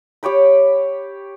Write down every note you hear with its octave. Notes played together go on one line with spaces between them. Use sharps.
G4 C#5 G5 B5